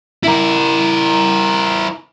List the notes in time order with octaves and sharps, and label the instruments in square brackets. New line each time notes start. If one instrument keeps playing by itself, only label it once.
[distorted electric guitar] E4 A#4